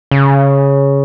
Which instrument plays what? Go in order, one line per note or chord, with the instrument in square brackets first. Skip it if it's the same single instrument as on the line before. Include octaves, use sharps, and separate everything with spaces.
[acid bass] C#3